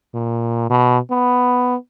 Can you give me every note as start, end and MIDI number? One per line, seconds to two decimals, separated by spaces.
0.14 0.68 46
0.70 0.98 47
1.11 1.76 59